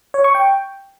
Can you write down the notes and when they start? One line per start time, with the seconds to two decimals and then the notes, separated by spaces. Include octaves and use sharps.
0.14 C#5
0.24 C#6
0.35 G5